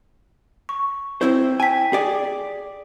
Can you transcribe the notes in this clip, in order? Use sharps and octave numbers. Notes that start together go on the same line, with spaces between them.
C#6
C4 E4 C5
G5 G#5 B6
G#4 D5